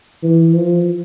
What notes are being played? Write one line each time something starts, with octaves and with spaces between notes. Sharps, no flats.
E3
F3